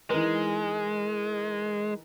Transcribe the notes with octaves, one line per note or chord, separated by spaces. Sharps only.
E3 G#3 D#4 A#4